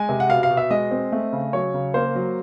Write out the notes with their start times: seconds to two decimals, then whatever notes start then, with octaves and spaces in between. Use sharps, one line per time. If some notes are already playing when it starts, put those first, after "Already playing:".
Already playing: G#3 G#5
0.09 C3
0.20 F#5
0.29 B2 F5
0.43 F5
0.51 B2
0.57 E5
0.70 G#3 D#5
0.91 C4
1.12 A3
1.33 C#3
1.53 F#3 C#5
1.74 C#3
1.94 A#3 C5
2.15 F#3